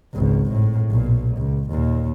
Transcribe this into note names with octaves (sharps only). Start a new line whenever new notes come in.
G#1 C#2
A2
B1 A#2
C#2
D#2 A#2